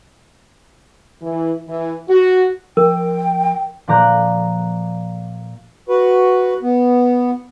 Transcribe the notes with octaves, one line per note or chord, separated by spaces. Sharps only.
E3
E3
F#4
F3 A#4 G5
A#2 F3 D5 A#5 F#6 G6
F#4 B4
B3